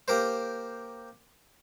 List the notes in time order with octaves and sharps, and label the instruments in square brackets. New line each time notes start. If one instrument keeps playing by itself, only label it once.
[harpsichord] A#3 G4 A#4 C5